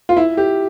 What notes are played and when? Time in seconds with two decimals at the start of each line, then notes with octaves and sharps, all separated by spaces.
0.09 F4
0.17 E4
0.37 G4